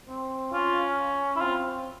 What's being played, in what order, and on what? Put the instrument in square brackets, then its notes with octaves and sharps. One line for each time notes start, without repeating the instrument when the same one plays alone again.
[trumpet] C4
[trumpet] C#4 [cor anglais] F4
[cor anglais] E4
[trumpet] C4 [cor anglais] F4